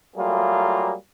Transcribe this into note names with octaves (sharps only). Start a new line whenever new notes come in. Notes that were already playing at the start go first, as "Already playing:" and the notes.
F#3 G3 A3 A#3 F4 G#4